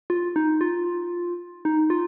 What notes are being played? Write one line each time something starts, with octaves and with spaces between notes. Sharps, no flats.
F4
D#4
F4
D#4
F4